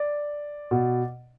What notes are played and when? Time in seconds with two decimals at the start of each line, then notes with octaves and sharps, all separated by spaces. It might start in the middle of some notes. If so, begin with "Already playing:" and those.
Already playing: D5
0.71 B2